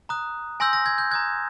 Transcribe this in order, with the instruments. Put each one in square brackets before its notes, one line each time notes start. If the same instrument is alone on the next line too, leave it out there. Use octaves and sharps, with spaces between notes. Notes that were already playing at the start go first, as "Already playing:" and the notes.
[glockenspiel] A#5 D#6 F#6
G#5 C6 E6 G6 A#6
A#6
G#6
G6
A#5 D#6 F#6 G#6